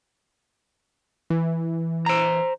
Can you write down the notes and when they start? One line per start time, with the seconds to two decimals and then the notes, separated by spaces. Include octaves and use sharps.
1.30 E3
2.06 C5 A#5